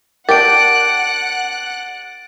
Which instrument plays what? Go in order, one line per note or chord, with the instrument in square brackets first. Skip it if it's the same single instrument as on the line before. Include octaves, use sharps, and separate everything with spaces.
[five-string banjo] D4 G4 [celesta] A#4 [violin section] F#5 F#6 [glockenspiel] A6 D7